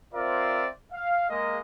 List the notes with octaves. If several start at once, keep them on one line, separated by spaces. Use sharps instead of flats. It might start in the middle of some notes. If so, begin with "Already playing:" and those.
C4 F4 A#4 C5 D5 E5
F5
G#3 A#3 D#5